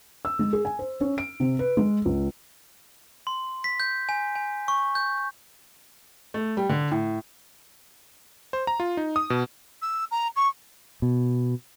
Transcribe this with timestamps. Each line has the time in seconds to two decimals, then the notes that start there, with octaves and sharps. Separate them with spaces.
0.25 E6
0.39 G#3
0.53 G#4
0.65 G#5
0.79 C5
1.01 C#4
1.18 D7
1.40 C3
1.59 B4
1.77 G#3
2.05 C#2
3.27 C6
3.64 B6
3.80 G6
4.09 G#5
4.36 G#5
4.68 C#6
4.95 G6
6.34 A3
6.57 G3
6.69 D3
6.91 A2
8.53 C5
8.67 A#5
8.80 F4
8.97 D#4
9.16 D#6
9.30 B2
9.82 E6
10.11 A#5
10.36 C#6
11.02 B2